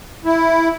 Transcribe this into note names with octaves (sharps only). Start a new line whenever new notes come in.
E4